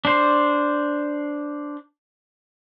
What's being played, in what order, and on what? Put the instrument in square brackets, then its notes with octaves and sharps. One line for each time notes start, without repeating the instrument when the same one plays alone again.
[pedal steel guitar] D4 C5